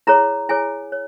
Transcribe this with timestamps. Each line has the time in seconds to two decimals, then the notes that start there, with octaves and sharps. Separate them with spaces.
0.07 E4 G#4 C#5 A#5
0.49 E4 G#4 C#5 G#5
0.92 C#5